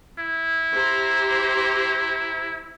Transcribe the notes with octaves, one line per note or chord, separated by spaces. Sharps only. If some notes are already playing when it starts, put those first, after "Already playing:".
E4
G4 C5 A#5